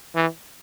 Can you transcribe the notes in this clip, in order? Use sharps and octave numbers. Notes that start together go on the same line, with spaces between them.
E3